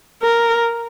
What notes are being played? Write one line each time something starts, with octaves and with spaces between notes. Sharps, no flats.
A#4